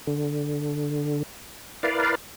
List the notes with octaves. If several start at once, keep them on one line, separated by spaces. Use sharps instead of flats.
D3
E4 A#4 B4 D5 F5